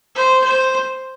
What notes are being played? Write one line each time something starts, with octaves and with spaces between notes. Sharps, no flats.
C5
C5